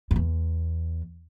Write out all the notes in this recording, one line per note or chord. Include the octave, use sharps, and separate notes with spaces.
F#2
E2